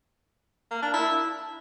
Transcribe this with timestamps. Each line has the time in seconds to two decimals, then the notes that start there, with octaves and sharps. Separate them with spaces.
0.71 A#3
0.82 D4
0.94 E4